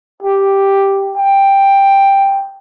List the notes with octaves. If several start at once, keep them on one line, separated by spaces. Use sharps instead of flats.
G4
G5